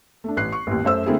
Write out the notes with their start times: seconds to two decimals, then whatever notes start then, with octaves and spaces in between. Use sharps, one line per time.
0.24 A3 D4
0.37 A1 F#6 C7
0.52 C#6
0.67 A1 D#2
0.84 F#2 A3 C5 E6
1.06 D3 A3 A#3 C4 E4 G#4